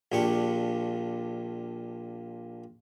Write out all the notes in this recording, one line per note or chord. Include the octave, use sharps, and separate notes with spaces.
A#1 A#2 D4 G4 C#6